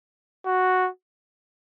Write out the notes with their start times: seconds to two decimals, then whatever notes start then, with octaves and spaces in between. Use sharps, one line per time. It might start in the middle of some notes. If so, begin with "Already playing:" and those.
0.46 F#4